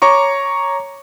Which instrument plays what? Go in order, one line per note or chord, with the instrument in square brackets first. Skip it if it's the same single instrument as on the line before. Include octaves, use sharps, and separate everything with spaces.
[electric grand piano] C#5 A#5 C#6 D6